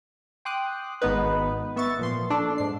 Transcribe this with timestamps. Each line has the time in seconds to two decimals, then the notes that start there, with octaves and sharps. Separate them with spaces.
0.45 G5 C6 D6 D#6 F#6
1.02 G#1 G#2 B3 D#4 B4
1.76 B3 E5 C#6 A6
1.99 A#2 F3 C6
2.30 D4 A4
2.58 G#2 C7